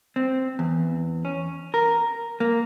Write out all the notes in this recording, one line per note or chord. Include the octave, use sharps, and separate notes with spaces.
C4
E2
C#4
A#4
A#3